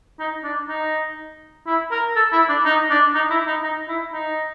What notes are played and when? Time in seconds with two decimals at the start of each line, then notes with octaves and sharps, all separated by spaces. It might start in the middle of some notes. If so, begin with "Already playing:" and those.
0.19 D#4
0.44 D4
0.68 D#4
1.67 E4
1.91 A#4
2.16 A4
2.32 E4
2.49 D4
2.65 D#4
2.90 D4
3.14 D#4
3.30 E4
3.47 D#4
3.63 D#4
3.88 E4
4.12 D#4